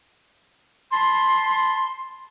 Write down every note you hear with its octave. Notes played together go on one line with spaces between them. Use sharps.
A5 B5 C6